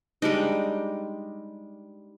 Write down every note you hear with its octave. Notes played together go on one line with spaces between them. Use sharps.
G3 G#3 D4 D#4